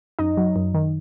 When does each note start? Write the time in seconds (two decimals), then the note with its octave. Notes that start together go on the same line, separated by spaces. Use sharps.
0.19 F#2 D#4 D#5
0.37 F#3
0.56 F#2
0.74 D#3